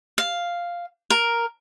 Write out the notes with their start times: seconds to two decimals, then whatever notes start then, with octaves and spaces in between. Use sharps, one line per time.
0.18 F5
1.10 A#4